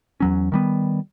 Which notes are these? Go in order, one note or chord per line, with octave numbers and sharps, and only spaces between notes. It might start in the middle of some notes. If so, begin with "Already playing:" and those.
E2 F#3 C#4
D#3 G3 B3